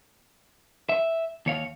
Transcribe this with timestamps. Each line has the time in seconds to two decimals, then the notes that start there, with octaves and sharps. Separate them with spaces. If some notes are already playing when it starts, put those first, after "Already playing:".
0.89 E5
1.46 D#2 C#5 F5